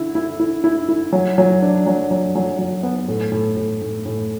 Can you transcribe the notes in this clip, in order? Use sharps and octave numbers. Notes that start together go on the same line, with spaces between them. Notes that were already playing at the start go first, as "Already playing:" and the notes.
Already playing: D3 E4
E4
E4
E4
E4
F#3
F#3
D4
F#3
F#3
F#3
F#3
B3
A2
A2
A2
A2
A2